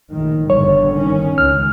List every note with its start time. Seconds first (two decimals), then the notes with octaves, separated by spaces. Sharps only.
0.13 A#1 A2 D#3
0.50 G1 D3 G3 C#5
0.97 D#3 C#4
1.38 C#2 F6